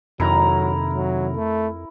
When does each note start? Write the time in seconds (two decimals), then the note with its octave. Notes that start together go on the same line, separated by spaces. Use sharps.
0.20 F2 C3 D#3 F#3 E4 A#4 A#5
0.94 F#3
1.36 A3